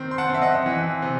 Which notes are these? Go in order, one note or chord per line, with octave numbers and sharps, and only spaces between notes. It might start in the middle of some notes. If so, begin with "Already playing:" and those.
Already playing: D#3 C4
C6
F#5 A5
C4 E5
D#5 F#5
E3
C3